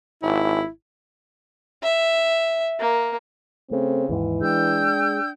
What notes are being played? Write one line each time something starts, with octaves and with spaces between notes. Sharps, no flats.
G#1 E4
E5
A#3
C#3 A3 C4
D#2 G#2 E3
G#3 D4 G5 E6 G6